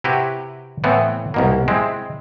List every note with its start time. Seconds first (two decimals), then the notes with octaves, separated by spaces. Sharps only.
0.04 C3 E4 F#4 G4 B4
0.84 A2 E3 A3 B3 C4
1.34 C2 B2 A#3
1.68 G#3 C4 E4